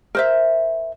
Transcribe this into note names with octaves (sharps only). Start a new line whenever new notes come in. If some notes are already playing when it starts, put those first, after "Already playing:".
A#4 C5 E5